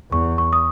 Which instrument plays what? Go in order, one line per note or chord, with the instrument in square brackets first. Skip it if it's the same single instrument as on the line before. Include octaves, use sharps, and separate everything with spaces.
[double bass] E2 [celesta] C#6
[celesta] C#6
D#6